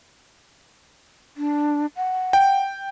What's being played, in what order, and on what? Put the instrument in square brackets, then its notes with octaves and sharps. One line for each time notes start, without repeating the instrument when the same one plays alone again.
[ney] D4
F#5
[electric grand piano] G5